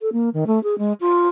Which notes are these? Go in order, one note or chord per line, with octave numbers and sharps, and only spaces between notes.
A4
A#3
D#3
A3
G#4
G#3
F4